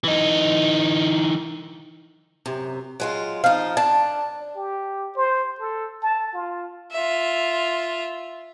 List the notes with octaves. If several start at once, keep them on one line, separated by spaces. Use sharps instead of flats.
E3 D#4
F#2 C3
F#3 G#3 F4
F3 D#4 F5
D4 A5
G4
C5
A4
A5
F4
F4 E5